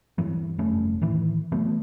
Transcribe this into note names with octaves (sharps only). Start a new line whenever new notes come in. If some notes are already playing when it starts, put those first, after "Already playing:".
G2 E3 F#3
F1 G2 A3 C#4
A2 D#3 E3
E3 F#3 A3 B3